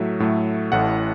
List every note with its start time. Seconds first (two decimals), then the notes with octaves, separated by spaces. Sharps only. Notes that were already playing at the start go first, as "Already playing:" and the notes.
Already playing: A2 F#3 A3 E5
0.20 A2 F#3 A3
0.72 A1 A2 A3 F#5